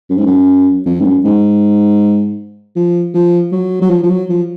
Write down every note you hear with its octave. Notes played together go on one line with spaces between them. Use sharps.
F#2
G#2
F#2
F2
G#2
F#2
G#2
F3
F3
F#3
F#3
F3
F3
F#3
F3